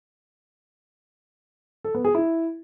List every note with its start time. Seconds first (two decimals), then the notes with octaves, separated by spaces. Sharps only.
1.84 A4
1.94 B3
2.05 G#4
2.15 E4